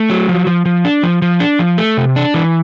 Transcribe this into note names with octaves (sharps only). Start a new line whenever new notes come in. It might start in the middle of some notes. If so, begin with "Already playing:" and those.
Already playing: A3
F#3
F3
F3
F3
D4
F3
F3
D4
F3
A3
C3
D4
E3